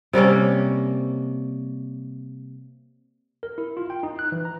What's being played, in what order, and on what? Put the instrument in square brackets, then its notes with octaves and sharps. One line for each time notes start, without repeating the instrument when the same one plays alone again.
[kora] C3 G3 A#3 C#4
[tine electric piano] A#4
E4
F4
G5
D#4
F#6
E3
A#5